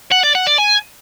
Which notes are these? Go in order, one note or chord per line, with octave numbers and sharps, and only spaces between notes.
F#5
D5
F#5
D5
G#5